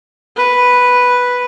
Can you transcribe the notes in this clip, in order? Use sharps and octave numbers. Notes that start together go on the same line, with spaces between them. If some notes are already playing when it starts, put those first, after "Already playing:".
B4